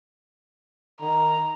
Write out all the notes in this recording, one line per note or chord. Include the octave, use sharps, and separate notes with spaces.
D#3 A#5